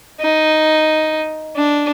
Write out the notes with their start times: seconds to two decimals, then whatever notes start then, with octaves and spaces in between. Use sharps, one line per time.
0.20 D#4
1.57 D4